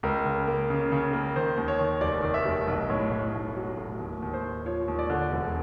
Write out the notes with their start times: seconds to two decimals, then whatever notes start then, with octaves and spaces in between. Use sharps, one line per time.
0.03 C#2 A#4
0.25 C#3
0.47 A#3
0.70 C#3
0.92 C#3
1.13 A#3
1.36 D#3 C5
1.57 D#2
1.68 C#5
1.80 D#3
2.01 F1 D5
2.23 D#3
2.34 E5
2.45 F1
2.67 B1 D#5
2.90 A2 C#5
3.11 A2
3.33 B1
3.56 F#3
3.78 A2
4.00 D#2
4.22 D#2
4.34 C5
4.44 D#2
4.65 F3 C#5
4.88 D#2
4.99 D5
5.10 D3
5.32 E1